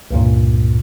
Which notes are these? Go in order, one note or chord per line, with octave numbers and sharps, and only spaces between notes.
C#2 G2 A#2